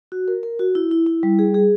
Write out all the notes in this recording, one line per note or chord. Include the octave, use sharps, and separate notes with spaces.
F#4
A#4
A#4
F#4
E4
E4
E4
G3
G#4
G#4